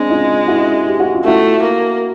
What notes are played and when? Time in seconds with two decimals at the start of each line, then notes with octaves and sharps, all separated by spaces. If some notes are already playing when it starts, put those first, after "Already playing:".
Already playing: G#3 C4 D4
0.09 D#4 F4
0.48 E4 F#4
0.86 G4
1.00 F#4
1.14 F4
1.24 A3 E4 F#4
1.63 A#3